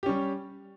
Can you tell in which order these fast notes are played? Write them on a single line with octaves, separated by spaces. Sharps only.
G4 C#4 G3